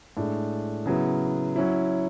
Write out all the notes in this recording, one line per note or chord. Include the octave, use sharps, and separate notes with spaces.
A2 G#3 D4
C#3 F#3 B3 E4
F#3 C#4 E4